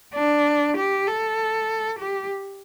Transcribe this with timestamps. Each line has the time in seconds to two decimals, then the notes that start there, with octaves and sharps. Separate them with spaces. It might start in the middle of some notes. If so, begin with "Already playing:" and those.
0.14 D4
0.76 G4
1.07 A4
1.99 G4